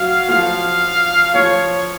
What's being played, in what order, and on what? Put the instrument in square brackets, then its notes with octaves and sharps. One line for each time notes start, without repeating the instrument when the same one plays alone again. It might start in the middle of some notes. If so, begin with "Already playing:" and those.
Already playing: [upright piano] F#3 [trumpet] F5
[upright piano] F3 [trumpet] F5
[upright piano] F3 [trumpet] C#5